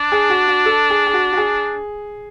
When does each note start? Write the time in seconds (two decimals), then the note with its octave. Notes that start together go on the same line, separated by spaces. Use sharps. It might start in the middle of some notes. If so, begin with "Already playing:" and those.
Already playing: D4
0.12 G#4
0.30 F#4
0.48 F#4
0.66 A4
0.90 G#4
1.07 G#4
1.14 F#4
1.33 F#4
1.37 G#4